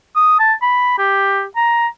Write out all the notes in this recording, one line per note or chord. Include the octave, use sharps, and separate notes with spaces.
D#6
A5
B5
G4
A#5